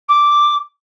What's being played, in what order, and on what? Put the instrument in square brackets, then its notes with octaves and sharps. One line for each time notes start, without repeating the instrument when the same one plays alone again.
[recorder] D6